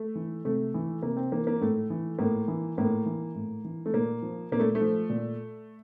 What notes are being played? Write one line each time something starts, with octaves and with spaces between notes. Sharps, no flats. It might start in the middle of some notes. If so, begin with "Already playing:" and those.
Already playing: A3
E3
C3 A3
E3
C3 A#3
C4
E3 A#3
A#3
A2 A3
E3
A2 A#3
E3
A2 A#3
E3
A2
E3
A3
A#2 A#3
F3
A#2 A#3
A3
A3
F3
A#2